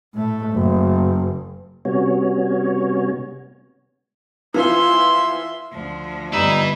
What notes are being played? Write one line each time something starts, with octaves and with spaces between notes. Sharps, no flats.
A2 A3
F#1
C3 G3 B3 C#4 F#4 C#5
E3 F3 E5 C6
D2 F3
G1 G2 G3 D#4 B4 E5 E6